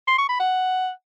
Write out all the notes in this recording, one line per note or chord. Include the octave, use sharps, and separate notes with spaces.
C6
C#6
B5
F#5